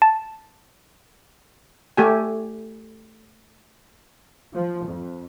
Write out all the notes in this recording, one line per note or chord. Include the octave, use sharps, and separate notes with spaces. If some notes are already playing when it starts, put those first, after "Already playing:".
A5
A3 G4 G#5
F3
F2